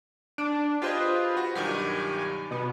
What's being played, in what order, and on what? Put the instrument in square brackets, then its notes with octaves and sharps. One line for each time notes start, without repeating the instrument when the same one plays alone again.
[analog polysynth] D4 [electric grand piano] D7
[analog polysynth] F4 G#4 B4 [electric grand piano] G4 C5 D#5
[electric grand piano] F#4 F#5
[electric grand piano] B1 G2 D#3 [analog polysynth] G4 G#5
[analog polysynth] B2 B3